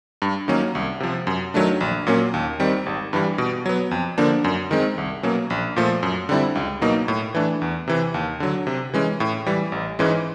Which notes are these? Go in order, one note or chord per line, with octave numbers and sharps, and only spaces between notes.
G2
D#3 F#3 A#3 C#4
C2
C3 F3
F#2
D#3 F#3 A3 D4
A#1
A#2 F#3 A#3 C#4
D#2
D#3 G3 C4
G#1
G2 E3 G3
B2
F#3 B3
F2
D3 F3 A#3 D4
F#2
D#3 G#3 C4
C2
B2 F#3 A#3 C#4
A#1
A#2 F3 A3
F#2
D3 G3 C4 E4
C#2
B2 F#3 A#3 D#4
A2
E3 A3 D4
E2
C3 E3
D#2
D3 F#3
C3
E3 G#3 C#4
A2
E3 G3
A1
G#2 E3 G#3 C#4